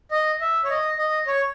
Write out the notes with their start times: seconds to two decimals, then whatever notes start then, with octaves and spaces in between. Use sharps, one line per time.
0.11 D#5
0.41 E5
0.64 C#5
0.70 D#5
0.98 D#5
1.27 C#5